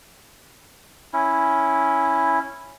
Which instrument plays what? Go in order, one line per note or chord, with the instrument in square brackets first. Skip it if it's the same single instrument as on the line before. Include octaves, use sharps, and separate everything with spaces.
[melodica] C#4 E4